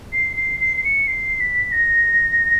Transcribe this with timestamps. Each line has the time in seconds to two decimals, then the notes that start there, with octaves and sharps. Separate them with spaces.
0.13 C7
0.37 C7
0.60 C7
0.77 C7
0.84 C#7
1.08 C7
1.40 B6
1.72 A#6